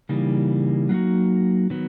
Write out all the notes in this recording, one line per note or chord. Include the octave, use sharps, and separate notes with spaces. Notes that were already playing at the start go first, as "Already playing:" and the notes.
C#3 E3 G3 A#3 D#4
F#3 A#3 D#4 F#4
D#3 F#3 B3